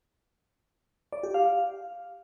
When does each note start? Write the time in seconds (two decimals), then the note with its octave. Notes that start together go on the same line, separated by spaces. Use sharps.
1.13 D5
1.23 G4
1.34 F5
1.45 F5